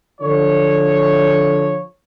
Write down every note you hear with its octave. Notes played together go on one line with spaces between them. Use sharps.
D3 F3 C#5